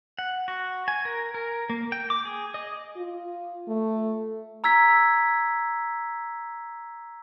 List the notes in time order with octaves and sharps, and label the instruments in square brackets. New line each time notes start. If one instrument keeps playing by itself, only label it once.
[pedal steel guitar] F#5
F#4
G#5
A#4
A#4
A#3
G5
D6
G#4
D#5
[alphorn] F4
A3
[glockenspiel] A#5 E6 G#6 B6